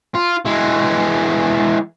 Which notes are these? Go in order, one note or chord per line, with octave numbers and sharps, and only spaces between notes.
F4
E3 G#3